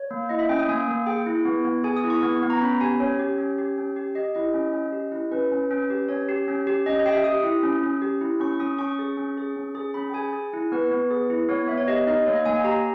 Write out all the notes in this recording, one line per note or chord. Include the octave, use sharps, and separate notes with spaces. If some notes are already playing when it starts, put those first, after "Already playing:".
Already playing: C#5
A#3
E4 D#5
E5
C#4 G5
D#6
A#3 G#5
A#3
G#4 G5
E4
B3
B3
G#4 G#5
D#6
E4
C#6
B3
B3
A#5
C#4 B5
G4 G#5
C#4 C#5
G4
C#4
G4
C#4
G4
G4 D#5
E4 D#5
C#4
C#4
G4
E4
C#4 B4
C#4
C#4
G4
C#4 C#5
G4
C#4
G4
C#4 D#5
D#5
G4 G5
E5
G4 D#6
E4
C#4
C#4
G4
E4
C#4 C#6
C#4 D#6
C#4 C#6
G#4
C#4
G#4
C#4
G#4
C#4 B5
G5
G#4 G#5
G#4
E4
B3 B4
B3
G#4
E4
B3 C#5
B3 E5
C#5
G4 D#5
D#4 D#5
A#3 C#5
D#5
A#3 G#5
G#5
G4 A#5